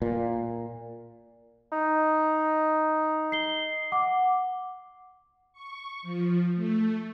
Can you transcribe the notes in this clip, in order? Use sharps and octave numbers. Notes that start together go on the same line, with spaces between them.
A#2
D#4
C7 G7
F#5 D6
C#6
F3
A3